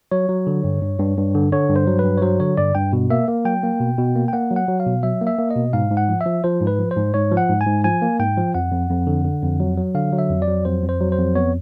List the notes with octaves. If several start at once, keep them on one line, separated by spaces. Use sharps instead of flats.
F#3 C#5
F#3
D3
G2
G2
G2
G2
D3
D3 C#5
G2
C5
F#3
B4
G2
C#5
F#3 C5
D3 C#5
G2 D5
G2 G5
B2
A#3 E5
A#3
F#3 G5
A#3
B2
B2
A#3
G5
A#3 F#5
F#3
F#5
F#3
F5
B2
F#3 E5
A#3
E5
A#3
D#5
B2
G#2 F5
G#2
F#5
F3
E5
F3
F3 C5
G#2
B4
F3
C5
G#2
G#2 C#5
F3
F#5
G#2
G#5
G#2
F3 G#5
A#3
G#2 G5
F3
F2 F#5
F2
F2
D3
D3
F2
F#3
F#3
D3 F5
F#3
E5
F2
D5
F#3
F2 C5
F2
C5
F#3
C5
F2
B3 C#5